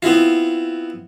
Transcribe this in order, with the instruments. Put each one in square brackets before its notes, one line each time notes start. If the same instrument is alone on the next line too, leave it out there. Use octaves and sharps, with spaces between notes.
[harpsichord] B3 C4 E4 F4